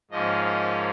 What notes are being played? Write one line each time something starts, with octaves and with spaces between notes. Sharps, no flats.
G#2 F3 A#3 C#4 D#5
D#5